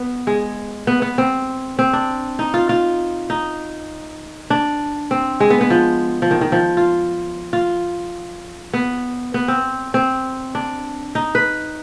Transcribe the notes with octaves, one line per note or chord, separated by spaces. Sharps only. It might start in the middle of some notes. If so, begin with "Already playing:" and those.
Already playing: B3
G#3
B3
B3
C4
C4
D4
D#4
F4
F4
D#4
D4
C4
G#3
B3
B3
F3
F3
D#3
D#3
F3
F4
F4
B3
B3
C4
C4
D4
D#4
B4